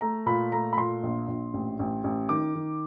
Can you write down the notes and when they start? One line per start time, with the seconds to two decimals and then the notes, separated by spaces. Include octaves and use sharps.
0.01 A3 A#5
0.26 A#2 B5
0.52 A3 A#5
0.73 B5
0.77 A#2 C6
1.03 A#1
1.28 A#1
1.54 A1
1.79 A1
2.04 A1
2.29 D#3 D6
2.55 D#3